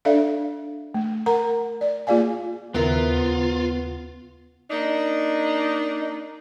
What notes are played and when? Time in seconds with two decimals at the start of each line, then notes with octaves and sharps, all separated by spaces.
0.05 D4 A4 D5 E5 F5
0.94 A3
1.26 A#4 F#5 A#5
1.81 D5
2.07 A#3 F4 G#4 D5 F5 G#5
2.75 D#2 C#3 B3 C4 E4 F4 A#4
4.71 A#3 D4 D#4